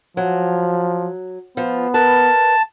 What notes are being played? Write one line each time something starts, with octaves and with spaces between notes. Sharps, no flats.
F3 F#3
F3 B3
A#4 B4 A5